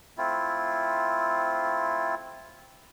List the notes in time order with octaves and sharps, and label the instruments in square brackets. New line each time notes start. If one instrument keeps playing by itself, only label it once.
[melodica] A3 C4 E4 F4